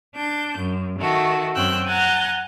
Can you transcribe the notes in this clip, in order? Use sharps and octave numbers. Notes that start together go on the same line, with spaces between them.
D4 G6
F#2
D#3 A3 F#4
F#2 C4 C#4 G5 E6 F#6
F#5 G#5 A#5 F#6 G6 A6